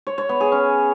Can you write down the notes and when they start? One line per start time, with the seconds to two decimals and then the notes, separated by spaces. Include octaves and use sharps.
0.07 C#5
0.18 C#5
0.29 B3
0.40 G#4
0.52 C#4